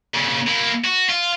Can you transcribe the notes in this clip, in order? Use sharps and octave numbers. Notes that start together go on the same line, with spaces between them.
A#2 C#3
A#3 E4
F#4
F4